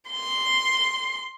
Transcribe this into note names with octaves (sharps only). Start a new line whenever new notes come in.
C6